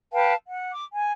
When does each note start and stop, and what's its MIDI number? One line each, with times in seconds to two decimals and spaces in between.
0.12 0.33 71
0.12 0.33 77
0.12 0.33 79
0.12 0.33 81
0.45 0.70 78
0.71 0.85 86
0.93 1.12 80